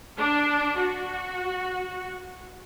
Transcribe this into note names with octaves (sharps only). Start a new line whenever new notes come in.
D4
F#4